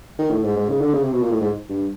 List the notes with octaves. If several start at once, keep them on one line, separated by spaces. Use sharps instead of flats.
D#3
A2
G#2
G#2
C#3
D3
C#3
C3
B2
A#2
A2
G#2
G2